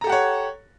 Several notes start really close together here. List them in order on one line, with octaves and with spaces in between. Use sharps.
A#5 A4 G4 F#5 C#5